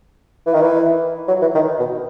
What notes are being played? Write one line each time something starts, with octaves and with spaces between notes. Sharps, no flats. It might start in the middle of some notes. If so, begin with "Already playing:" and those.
E3
D#3
E3
F#3
E3
D#3
B2